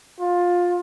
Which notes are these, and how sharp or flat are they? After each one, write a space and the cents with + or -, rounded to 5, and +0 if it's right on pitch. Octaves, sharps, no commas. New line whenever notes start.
F4 +15